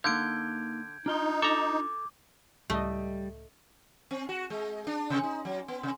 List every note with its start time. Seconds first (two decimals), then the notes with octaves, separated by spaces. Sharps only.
0.04 D3 A#3 D#4 F5 G6 G#6 D7
1.06 D4 D#4 F4 C6
1.42 A4 A#5 D6
2.70 C#2 A2 G3 A3 D#5
4.11 C4
4.29 F#4
4.50 G#3
4.87 D4
5.10 C3
5.23 D#4
5.45 F#3
5.68 B3
5.83 C3